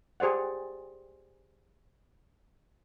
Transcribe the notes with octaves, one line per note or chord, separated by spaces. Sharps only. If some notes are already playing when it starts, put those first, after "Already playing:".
G4 G#4 C5 D5 F#5